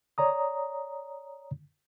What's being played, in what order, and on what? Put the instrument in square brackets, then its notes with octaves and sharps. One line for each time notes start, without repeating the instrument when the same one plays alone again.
[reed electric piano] C#5 D5 A#5 D#6